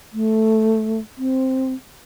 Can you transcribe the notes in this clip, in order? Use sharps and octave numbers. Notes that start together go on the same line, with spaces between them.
A3
C4